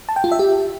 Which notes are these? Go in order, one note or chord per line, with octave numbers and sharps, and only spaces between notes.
A5
G5
F4
E5
G4